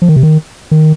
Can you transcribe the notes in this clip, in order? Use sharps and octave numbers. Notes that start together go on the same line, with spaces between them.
F3
D#3
C3
D#3
D#3